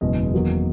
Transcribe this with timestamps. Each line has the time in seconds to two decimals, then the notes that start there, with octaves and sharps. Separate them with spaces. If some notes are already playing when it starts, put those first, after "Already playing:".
0.01 F#1 E2 B2 G#3 B3 D#5
0.33 E2 D#3 F#3 A#3